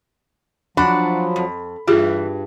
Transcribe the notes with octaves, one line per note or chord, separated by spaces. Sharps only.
F3 F#3 D4 F#4 B5
F2
G2 E3 F4 G4 G#4